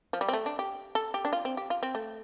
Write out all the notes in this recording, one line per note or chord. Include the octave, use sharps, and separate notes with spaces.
F3
G3
C4
A3
D4
G4
A4
G4
D4
F4
C4
G4
F4
C4
A3